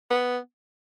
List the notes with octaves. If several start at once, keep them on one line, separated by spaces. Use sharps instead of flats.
B3